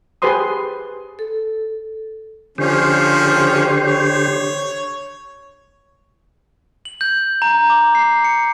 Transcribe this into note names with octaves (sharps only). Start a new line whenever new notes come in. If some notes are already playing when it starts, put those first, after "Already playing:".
G4 G#4 B4 C5 C6 D#6
A4
D3 F3 C#4 G4 C5
C#5
F#7
G6
A#5
D6
C7
C#7